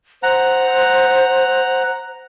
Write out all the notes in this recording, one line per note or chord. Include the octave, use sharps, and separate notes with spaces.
C5 F#5 A#5